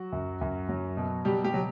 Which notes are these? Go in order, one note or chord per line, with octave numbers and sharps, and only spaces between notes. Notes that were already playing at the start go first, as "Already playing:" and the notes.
Already playing: F#3 F#4
F#2
F#2
F#3
B2
B2 G3 G4
G3 G4
F#3